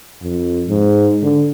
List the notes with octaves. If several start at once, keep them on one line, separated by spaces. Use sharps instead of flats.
F2
G#2
D3